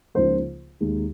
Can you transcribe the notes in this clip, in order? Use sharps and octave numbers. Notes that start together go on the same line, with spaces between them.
C#2 C#3 F3 A#3 D#4 C5
D#2 D#3 G#3 D#4